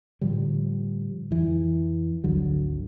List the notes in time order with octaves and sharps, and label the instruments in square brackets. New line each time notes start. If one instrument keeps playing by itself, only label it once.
[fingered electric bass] A2 D3 F3 G3
F2 E3
G#1 D2 D3 F#3